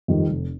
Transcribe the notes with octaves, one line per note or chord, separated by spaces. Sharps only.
F2 D#3 G3
F1